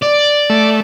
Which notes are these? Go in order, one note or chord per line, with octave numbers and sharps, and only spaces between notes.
D5
A3